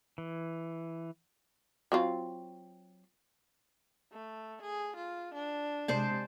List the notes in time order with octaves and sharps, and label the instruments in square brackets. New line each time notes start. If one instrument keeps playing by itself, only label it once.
[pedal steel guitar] E3
[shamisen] F#3 C4 F4
[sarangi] A3
G#4
F4
D4
[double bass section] C3 G#3 [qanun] C5 D5 A5